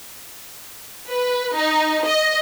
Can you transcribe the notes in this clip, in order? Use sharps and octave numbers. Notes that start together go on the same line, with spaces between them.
B4
D#4
D#5